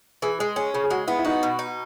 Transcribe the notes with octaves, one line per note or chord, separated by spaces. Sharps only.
E3 G#4
G#3 G#4
C#4 G#4
C#3 G#4
G#4
G#3 F#4
B3 E4
E4
D#4 F#4
B2
D#4